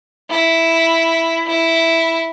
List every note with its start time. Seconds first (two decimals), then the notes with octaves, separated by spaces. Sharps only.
0.30 E4
1.47 E4